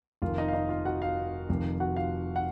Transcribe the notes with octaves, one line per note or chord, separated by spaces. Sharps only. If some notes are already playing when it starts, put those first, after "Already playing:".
F1 F2 D#3 A#3 F4
D#4 D#5
F5
D#4 D#5
F4 F5
F#4 F#5
F4 F5
F1 F2 C3 D#3
F#4 F#5
F4 F5
F#5